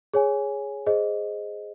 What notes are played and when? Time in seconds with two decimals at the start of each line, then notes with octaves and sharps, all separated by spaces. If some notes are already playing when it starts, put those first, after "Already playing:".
0.14 G#4 C#5 G#5
0.86 G#4 C5 D#5